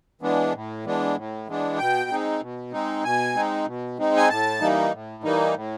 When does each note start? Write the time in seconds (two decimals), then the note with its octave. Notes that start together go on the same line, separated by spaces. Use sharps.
0.21 E3 G#3 B3 D4
0.54 A2
0.85 E3 G#3 B3 D4
1.16 A2
1.47 E3 G#3 B3 D4
1.78 B2 G5
2.10 G#3 C4 D#4
2.41 B2
2.72 G#3 C4 D#4
3.04 B2 G#5
3.35 G#3 C4 D#4
3.66 B2
3.98 G#3 C4 D#4
4.17 G#5
4.29 A2 A5
4.60 E3 G3 A#3 D#4
4.92 A2
5.23 E3 G3 A#3 D#4
5.55 A2